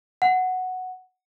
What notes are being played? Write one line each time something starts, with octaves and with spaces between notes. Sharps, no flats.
F#5